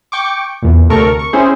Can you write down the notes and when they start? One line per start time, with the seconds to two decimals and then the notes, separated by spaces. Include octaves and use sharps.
0.12 G5 C#6 D6
0.62 E2 A#2
0.90 D2 C3 A4 A#4 C#6
1.19 C#6
1.33 C4 C#4 E4 G#4 C5